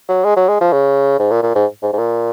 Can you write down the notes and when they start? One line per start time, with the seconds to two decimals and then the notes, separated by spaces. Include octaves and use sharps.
0.09 F#3
0.24 G#3
0.36 F#3
0.48 G#3
0.61 F3
0.72 C#3
1.19 G#2
1.31 A#2
1.43 A#2
1.55 G#2
1.82 G#2
1.93 G#2
1.98 A#2